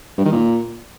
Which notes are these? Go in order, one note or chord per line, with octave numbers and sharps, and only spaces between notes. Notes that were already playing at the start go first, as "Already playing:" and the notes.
G2
D#3
A#2